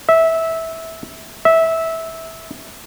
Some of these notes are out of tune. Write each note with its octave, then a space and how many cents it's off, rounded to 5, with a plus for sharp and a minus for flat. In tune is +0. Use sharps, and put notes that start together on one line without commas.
E5 -15
E5 -15